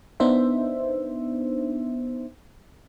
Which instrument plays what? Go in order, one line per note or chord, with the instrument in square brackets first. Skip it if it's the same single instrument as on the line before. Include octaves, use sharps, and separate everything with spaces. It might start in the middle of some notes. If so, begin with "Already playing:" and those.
[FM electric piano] B3 D4 D#4 C5 E5